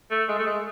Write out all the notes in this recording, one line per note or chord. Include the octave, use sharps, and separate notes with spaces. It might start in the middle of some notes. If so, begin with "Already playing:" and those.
A3
G#3
A3
G#3